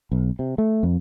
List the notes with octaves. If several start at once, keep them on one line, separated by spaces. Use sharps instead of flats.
B1
C3
A3
F2